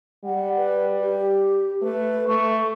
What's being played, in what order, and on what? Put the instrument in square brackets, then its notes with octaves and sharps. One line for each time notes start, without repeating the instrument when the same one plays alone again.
[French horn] G3 [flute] F#5
[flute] B4
G4
[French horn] A3 [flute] B4
[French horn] A3 [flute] C#6